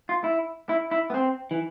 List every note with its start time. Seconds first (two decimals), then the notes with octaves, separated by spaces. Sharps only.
0.09 F4
0.24 E4
0.69 E4
0.91 E4
1.10 B3
1.14 C4
1.51 E3